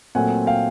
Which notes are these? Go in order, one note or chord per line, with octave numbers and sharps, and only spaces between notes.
A#2 F#3 A3 C4 F#5 G#5
F5 G5